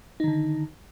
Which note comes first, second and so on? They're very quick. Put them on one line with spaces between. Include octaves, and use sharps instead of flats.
D#4 D#3 D3